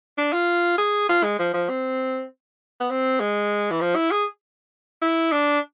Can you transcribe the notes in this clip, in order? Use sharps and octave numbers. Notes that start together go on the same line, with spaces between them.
D4
F4
G#4
F4
G#3
F3
F3
C4
B3
C4
G#3
E3
F3
E4
G#4
E4
D4